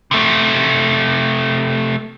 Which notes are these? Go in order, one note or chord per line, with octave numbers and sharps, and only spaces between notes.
C3 A3